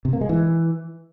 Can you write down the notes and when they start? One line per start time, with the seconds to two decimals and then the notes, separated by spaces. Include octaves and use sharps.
0.05 C3
0.13 A#3
0.21 G#3
0.29 E3